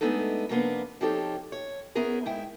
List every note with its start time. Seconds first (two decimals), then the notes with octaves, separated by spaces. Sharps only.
0.01 G#3 A3 B3 D4 D#4 A4
0.49 C3 F3 A#3 B3 D4
1.01 F3 C4 D#4 G4 A4 C#5
1.52 C#5
1.95 B3 C#4 E4 G#4 A#4
2.26 G#2 E4 G5